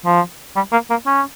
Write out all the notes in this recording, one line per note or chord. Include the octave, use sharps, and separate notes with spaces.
F3
G3
A#3
A#3
C#4